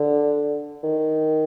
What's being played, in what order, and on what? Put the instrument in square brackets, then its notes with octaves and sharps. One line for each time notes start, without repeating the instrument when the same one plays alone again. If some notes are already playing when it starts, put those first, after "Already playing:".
Already playing: [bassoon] D3
D#3